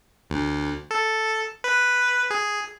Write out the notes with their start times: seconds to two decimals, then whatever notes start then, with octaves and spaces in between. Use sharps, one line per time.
0.30 D2
0.91 A4
1.64 B4
2.30 G#4